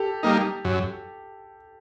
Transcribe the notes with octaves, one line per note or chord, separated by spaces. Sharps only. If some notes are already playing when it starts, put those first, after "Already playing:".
Already playing: G4 A4
G3 A#3 D#4
F#2